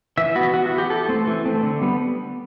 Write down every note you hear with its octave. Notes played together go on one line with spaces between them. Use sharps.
E3 E5
B3 F#4
E3 F#4
F#4
B3
G4
E3 A4
A3 C4
E3
A3 C4
D3
G3 B3